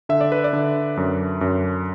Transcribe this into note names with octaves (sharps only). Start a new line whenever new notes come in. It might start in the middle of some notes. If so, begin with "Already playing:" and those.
D3 E5
D5
B4
D5
D3
F#2
F#2